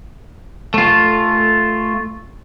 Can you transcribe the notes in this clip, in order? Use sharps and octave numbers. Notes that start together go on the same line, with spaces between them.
A3 F4